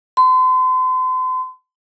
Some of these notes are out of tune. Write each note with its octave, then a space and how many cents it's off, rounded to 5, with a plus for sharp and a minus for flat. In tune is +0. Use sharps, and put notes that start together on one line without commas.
C6 -40